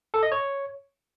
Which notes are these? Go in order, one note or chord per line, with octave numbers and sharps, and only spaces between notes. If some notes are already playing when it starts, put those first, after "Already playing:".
A4
D#5
C#5